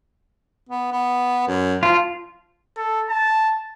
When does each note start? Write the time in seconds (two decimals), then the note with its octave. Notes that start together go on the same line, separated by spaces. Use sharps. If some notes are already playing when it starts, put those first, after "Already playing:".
0.69 B3
0.92 B3
1.48 F#2
1.83 F3 F4
2.77 A4
3.10 A5